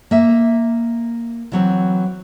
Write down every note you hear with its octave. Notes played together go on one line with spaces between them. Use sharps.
A#3 E5
E3 F#3 C4